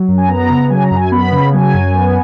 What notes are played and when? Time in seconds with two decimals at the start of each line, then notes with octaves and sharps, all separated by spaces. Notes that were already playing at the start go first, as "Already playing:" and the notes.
Already playing: F#3
0.08 F#2
0.18 G#5
0.29 B3 A#5
0.50 C#3
0.70 F#3 G#5
0.83 A#5
0.91 F#2
0.96 G#5
1.11 B3 B5
1.32 C#3
1.53 F#3 G#5
1.74 F#2
1.94 B3